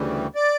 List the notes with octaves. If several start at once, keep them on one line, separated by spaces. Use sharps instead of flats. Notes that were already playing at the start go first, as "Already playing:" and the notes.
Already playing: D2 C#3 E3 G3
D5